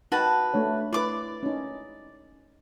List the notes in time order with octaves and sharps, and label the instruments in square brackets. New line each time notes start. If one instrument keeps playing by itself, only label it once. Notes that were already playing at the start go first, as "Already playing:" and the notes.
[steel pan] D#4 G5 [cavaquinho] F#4 B4 A5
[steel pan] A3 D4 C#5
[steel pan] E4 B4 [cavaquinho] D5 D6
[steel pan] C#4 D#4